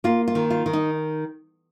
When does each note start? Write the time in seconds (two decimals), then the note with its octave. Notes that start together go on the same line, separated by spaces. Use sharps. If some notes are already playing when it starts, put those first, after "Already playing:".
0.04 A#3 F4
0.28 F4
0.35 D#3
0.50 F4
0.66 D#3
0.73 D#4